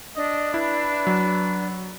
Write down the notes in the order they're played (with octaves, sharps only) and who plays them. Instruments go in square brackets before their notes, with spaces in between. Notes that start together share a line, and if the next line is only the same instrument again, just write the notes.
[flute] D4 [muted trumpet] D#5
[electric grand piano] E4 [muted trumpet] B4
[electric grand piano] F#3